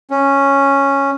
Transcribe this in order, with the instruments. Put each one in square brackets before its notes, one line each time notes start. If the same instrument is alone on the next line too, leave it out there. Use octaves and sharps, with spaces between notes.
[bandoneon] C#4